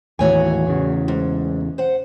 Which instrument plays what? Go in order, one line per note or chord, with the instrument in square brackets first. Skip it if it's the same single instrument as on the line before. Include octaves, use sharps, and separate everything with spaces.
[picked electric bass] D#2 A2 E3 [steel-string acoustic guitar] F#4 C#5 G#5
[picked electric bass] E2 C#3
[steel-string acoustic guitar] G#2
C5 F#5